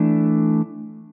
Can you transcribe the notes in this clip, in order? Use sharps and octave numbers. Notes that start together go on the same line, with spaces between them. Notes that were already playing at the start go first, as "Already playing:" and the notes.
Already playing: E3 A3 D4